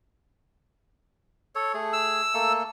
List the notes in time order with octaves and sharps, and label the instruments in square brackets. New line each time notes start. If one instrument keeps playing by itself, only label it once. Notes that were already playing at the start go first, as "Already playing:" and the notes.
[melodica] A4 C#5
A3 G#4
[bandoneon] E6
[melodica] A3 A#3 A4